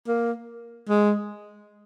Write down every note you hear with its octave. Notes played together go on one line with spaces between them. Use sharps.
A#3
G#3